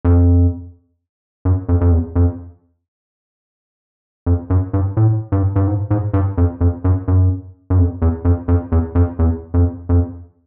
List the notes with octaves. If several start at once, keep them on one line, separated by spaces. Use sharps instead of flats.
F2
F#2
F2
F2
E2
F2
F2
F#2
G2
A2
G2
G2
G#2
G#2
G2
F2
F2
F#2
F#2
F#2
F2
E2
F2
F2
E2
F2
E2
F2
F2